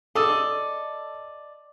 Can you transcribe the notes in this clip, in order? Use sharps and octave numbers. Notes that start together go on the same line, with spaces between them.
A4 D5 D#5 E6